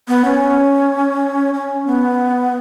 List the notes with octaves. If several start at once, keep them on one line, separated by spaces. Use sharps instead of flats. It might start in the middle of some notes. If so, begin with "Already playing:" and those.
B3
C#4
C#4
B3